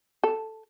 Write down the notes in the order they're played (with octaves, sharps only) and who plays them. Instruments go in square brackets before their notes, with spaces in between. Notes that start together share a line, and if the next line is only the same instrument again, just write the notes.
[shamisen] A4